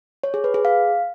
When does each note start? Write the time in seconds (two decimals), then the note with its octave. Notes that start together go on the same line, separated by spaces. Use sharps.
0.24 C#5
0.34 G#4
0.44 B4
0.54 G#4
0.65 F5